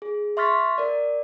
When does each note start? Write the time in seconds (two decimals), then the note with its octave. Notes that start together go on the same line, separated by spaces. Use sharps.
0.02 G#4
0.37 E5 C6 C#6 F6 A6 B6
0.78 A#4 D5